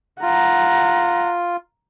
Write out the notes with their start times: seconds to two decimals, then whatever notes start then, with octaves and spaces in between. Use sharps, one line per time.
0.22 F4 F#5 A#5